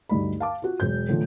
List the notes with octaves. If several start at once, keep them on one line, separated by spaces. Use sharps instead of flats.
D2 G2 D#4 B5
F5 A5 D6
F4 F#4
E1 F#3 G6
A2 D3 E3 F3